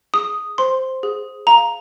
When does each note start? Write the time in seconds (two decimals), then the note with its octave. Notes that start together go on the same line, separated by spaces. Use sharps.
0.14 G#4 D#6
0.58 C5 C6
1.03 G#4
1.47 F5 A#5